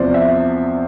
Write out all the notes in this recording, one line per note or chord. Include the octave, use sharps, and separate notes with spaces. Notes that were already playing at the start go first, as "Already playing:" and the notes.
Already playing: E2 C3 F3 C5 D5
E5